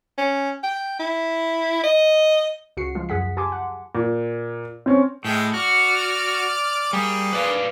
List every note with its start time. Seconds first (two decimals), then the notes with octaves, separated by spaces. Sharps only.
0.18 C#4
0.63 G5
0.99 E4
1.84 D#5
2.77 C#2 C#3 F#4 C7 C#7
2.95 F3 G#3 F4
3.09 F#2 G#4 F#5 B6
3.37 G4 G#5 A5 C6 D6
3.52 F#5
3.95 A#2
4.86 C4 C#4
5.25 A2 G#3 G#4 G5
5.54 F#4 D5 F6
6.93 G3 A#3 G#4
7.33 B4 D5 F5